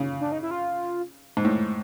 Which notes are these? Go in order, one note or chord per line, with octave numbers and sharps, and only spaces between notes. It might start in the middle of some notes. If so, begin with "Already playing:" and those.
Already playing: C#3
D4
D#4
E4
F4
G#2
A2